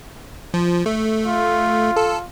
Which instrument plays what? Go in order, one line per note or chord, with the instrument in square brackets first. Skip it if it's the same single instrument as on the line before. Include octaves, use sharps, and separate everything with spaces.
[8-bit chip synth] F3
A3
[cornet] F4
[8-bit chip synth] A4